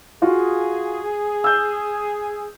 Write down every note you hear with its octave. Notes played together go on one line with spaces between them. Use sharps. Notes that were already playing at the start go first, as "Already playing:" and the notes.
F4 F#4 G#4 F5
E6 G6